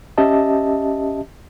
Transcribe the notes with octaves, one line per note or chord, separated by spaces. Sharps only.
C#4 G4 D#5 E5 A5